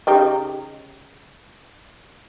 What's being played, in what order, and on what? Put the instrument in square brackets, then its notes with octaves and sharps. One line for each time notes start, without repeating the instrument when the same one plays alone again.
[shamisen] C#3 D#4 G4